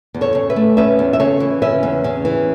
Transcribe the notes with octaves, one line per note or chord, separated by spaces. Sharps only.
E2
A4 C#5
C#3
B4 E5
A3
C#4 B4 E5
E2
E5
C#3 A4 C#5
E3
C#4 B4 E5
E2
C#3
E3